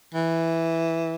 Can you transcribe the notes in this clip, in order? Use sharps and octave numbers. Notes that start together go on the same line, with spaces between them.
E3